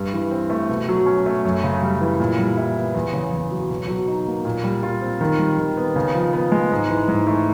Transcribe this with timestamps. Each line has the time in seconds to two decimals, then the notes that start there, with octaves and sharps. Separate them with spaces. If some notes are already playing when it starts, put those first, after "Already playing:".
Already playing: G2 G3
0.13 E3
0.31 C4
0.50 A3
0.69 B2
0.89 F#3
1.06 C#4
1.26 A3
1.45 F#2
1.64 C#3
1.83 G3
2.01 E3
2.20 A#2
2.39 G3
2.57 E4
2.76 B3
2.95 E2
3.13 C#3
3.32 E2
3.51 F#3
3.70 B2
3.88 F#3
4.08 D#4
4.27 A#3
4.45 A#2
4.64 G3
4.83 F4
5.01 C4
5.21 D#3
5.39 G3
5.58 D#3
5.77 B3
5.96 C#3
6.14 F3
6.34 B3
6.52 G#3
6.72 G#2
6.90 E3
7.08 G#2
7.27 A3